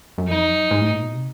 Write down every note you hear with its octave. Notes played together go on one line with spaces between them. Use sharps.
F#2
F2 D#4
F#2
G#2
A2
A#2
B2
C3